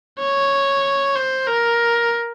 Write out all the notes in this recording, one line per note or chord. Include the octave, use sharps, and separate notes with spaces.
C#5
C5
A#4